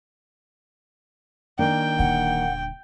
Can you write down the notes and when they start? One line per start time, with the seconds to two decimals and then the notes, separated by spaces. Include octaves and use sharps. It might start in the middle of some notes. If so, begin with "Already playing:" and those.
1.59 D#3 A#3 D4 G5
1.99 D#1 D3 F#5